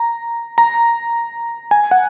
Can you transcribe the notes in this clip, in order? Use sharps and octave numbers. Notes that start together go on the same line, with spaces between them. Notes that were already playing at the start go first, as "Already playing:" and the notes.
Already playing: A#5
A#5
G#5
F#5